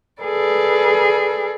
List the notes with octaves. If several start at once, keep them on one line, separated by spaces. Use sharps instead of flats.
G#4 A4 B4 D5